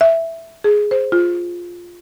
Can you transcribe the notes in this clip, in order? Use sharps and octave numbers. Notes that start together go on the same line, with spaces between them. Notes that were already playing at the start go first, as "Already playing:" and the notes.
E5
G#4
C5
F4